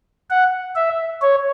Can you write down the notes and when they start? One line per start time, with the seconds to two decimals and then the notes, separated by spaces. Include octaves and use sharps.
0.30 F#5
0.76 E5
1.22 C#5